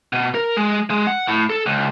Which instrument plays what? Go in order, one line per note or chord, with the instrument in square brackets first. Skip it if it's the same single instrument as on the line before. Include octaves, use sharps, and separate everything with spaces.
[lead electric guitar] B2
A#4
G#3
G#3
F#5
A2
A4
C#2